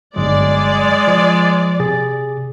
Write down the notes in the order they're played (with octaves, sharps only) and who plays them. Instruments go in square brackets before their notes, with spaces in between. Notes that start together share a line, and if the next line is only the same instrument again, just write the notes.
[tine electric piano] G1 F#3 [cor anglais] G#3 [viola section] D5
[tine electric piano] F3
C3 G#4 A6